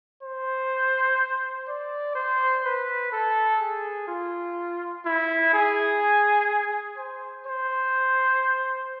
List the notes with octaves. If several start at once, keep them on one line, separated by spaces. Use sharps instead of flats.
C5
D5
C5
B4
A4
G#4
F4
E4
G#4
C5
C5